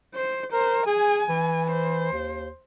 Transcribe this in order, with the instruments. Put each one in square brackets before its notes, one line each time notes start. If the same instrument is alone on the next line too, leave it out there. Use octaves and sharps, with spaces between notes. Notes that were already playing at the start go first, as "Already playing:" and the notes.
[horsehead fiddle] C5
[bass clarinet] A#4 [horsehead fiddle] C5
[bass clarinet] G#4 [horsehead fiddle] G#5
[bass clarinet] E3
[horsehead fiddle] C5
[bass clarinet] D#2